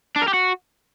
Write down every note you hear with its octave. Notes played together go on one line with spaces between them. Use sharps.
D4
A#4
G4
F#4